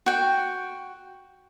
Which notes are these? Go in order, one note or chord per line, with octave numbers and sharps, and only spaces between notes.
F#4 G5